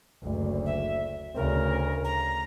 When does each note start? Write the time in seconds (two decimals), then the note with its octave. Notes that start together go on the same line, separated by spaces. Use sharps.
0.23 F#1 D2
0.66 E5
1.36 D2 C#3 A#4
2.04 A#5